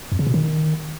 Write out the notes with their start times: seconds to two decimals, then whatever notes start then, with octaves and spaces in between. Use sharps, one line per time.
0.12 F2
0.19 C#3
0.27 B2
0.34 D#3